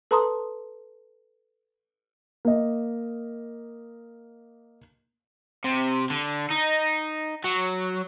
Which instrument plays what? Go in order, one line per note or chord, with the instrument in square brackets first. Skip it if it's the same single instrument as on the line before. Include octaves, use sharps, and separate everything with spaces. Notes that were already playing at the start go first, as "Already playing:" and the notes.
[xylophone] A4 B4 A5 A#5 C6 D#6
[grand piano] A#3 D#5
[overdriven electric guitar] C3
D3
D#4
F#3